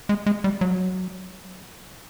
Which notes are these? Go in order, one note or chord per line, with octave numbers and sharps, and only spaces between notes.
G#3
G#3
G3
F#3